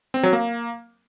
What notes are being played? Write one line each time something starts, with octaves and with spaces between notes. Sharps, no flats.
C4
F#3
A#3